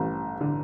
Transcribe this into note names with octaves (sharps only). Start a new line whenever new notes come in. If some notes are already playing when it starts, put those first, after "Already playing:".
Already playing: A1 G2
D3